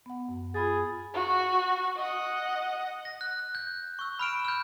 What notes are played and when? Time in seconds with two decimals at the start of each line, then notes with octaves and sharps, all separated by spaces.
0.06 B3 F#5
0.29 F#2
0.54 F4 G#4 B5 A6
1.14 F#4
1.97 D#5 F#5
3.05 A#6
3.21 F#6
3.55 G6
3.99 C#6 E6
4.19 B5 F6 D7 E7
4.45 F6 G6